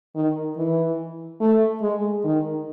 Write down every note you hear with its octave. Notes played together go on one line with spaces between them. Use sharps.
D#3
E3
A3
G#3
D#3